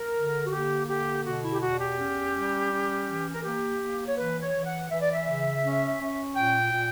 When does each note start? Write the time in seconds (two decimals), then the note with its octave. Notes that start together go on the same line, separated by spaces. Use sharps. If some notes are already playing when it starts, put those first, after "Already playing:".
Already playing: A#4
0.15 D3
0.46 F#4
0.52 A#3 G4
0.88 D3 G4
1.25 B2 F#4
1.43 E4
1.53 G4
1.61 E2 F#4
1.79 G4
1.98 C#4
2.34 G3
2.71 C#4
3.07 E3
3.34 A#4
3.44 A#3 G4
3.80 A#3
4.07 C#5
4.17 E3 B4
4.41 C#5
4.54 E3
4.66 F#5
4.90 E3 E5
5.02 D5
5.13 E5
5.27 C#3
5.63 C#4
6.00 C#4
6.36 A#2 G5
6.73 A#2